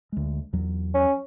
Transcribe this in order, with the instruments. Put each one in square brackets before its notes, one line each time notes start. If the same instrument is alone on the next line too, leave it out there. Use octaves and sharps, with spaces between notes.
[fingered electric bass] D2 G#3
E2 F#3
[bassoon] C#4